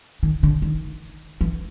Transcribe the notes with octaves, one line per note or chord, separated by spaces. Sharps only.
D#3
D3
D#3
E3